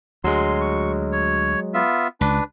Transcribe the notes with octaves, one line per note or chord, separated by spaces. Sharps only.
D2 F#3 G#3 C6
C#6
C#5
B3 F4 E5
C#2 D4 B4